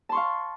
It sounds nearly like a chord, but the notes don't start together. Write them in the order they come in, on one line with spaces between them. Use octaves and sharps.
A5 C6 C#6 F5